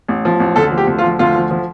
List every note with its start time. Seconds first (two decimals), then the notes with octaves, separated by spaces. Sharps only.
0.08 A1
0.25 F3
0.40 A1
0.56 D2 A4
0.72 F3
0.78 G4
0.87 D2
0.98 F4
1.04 F3
1.19 D2 F4
1.35 F3
1.51 F3